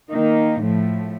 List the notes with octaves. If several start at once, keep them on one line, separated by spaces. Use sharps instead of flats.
D#3 A#3 D#4
A2 F3 A3